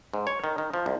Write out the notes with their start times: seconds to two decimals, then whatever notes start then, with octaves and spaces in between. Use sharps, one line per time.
0.14 G#2
0.27 C#5
0.44 D#3
0.58 D#3
0.74 F3
0.86 C2